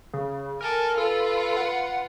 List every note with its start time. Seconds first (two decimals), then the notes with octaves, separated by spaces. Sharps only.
0.14 C#3
0.61 A4 A#4 G#5
0.98 F4 A4 B4
1.57 F#5